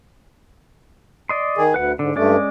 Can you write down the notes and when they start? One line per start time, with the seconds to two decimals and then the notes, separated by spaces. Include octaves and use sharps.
1.29 D5 D#5 C6
1.58 D#3 G#4
1.74 D2 B4 F#5
1.99 G#2 D3
2.16 G2 G#3 A3 C#4 D5